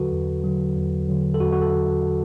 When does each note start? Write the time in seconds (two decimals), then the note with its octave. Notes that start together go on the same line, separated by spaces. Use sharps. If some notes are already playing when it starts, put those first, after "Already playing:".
Already playing: E2 D3 F#3 F#4 A4 B4
0.11 E2
0.44 D3 F#3
0.76 E2
1.09 D3 F#3
1.34 A4
1.40 E2 F#4
1.52 F#4
1.62 A4